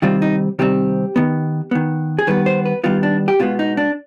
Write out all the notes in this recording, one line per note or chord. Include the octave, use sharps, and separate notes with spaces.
C3 D#3 G3 C4 F4
D#4
C3 D#3 G3 C4 G4
D#3 B3
D#3 B3
G#4
D#3 G3 B3 B4
C5
B4
D#3 G3 B3 F4
D4
G4
B2 G#3 B3 F4
D#4
D4